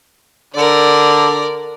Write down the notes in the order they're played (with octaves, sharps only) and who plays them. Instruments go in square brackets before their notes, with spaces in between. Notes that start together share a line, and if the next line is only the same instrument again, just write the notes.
[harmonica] D3 [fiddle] A#4 D5